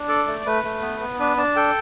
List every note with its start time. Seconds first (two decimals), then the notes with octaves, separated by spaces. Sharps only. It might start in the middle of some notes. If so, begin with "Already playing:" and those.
Already playing: D4
0.08 A4 D5
0.27 A3
0.46 A3 B4
0.64 A3
0.82 B3
1.00 B3
1.19 D4 B4
1.37 D4 A5
1.56 A4 G5